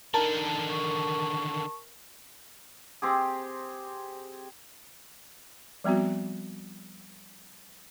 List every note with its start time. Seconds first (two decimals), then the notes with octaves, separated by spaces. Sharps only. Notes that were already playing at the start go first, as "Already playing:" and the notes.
0.14 D3 D#3 A#4 A5
0.69 C#6
3.02 C4 G4 G#4
5.84 F3 G3 B3 C4 F#4